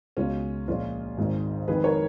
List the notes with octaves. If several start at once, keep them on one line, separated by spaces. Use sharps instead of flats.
C#2 B2 G#3 C#4 F4
A#1 A#2 F3 G#3 C#4 F4
G#1 G#2 D#3 G#3
F2 D#3 G#3 G#4 B4
A#4 C#5